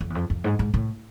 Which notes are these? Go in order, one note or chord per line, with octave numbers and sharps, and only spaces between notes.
F2
E2
F2
F2
G#2
G#2
A2